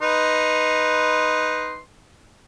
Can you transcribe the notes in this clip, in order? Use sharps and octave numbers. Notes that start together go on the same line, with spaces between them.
D#4 B4 C6